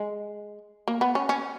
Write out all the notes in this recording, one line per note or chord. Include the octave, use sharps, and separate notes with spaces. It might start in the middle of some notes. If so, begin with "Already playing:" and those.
Already playing: G#3
A#3
B3
C#4
C#4